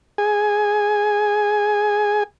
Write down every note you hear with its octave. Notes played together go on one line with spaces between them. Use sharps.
G#4 G#5